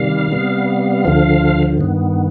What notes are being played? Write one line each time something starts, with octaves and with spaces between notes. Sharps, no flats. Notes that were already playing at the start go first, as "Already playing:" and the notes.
Already playing: C3 D#3 G3 F5
C3 G3 B3
D2 D3 F3
G2 D#3 B3